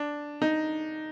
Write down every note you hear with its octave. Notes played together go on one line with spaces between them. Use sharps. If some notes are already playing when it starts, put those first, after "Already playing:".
Already playing: D4
D#4